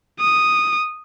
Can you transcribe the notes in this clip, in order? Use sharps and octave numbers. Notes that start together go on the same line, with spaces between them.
D#6